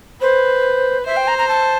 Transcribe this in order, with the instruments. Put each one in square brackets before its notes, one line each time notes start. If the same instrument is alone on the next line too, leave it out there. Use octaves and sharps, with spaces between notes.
[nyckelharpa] B4 [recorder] C5
[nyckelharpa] C5 [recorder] E5
[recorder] G5
A#5
A#5
A5